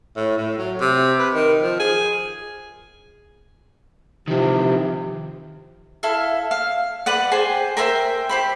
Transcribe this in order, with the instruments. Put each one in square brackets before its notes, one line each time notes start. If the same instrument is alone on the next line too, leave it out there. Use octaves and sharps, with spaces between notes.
[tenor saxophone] A2
A2
F#3
C3
B4
D#3
F3
G#4
[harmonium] C3 [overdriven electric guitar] D#3 F3
[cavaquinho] E4 A4 E5 F5
F5
B4 D5 F#5
G#4 C5 G5
A#4 C5 E5 G5
G4 C5 B5